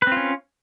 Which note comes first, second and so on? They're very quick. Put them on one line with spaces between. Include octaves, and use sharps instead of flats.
B4 C4 F4 C#4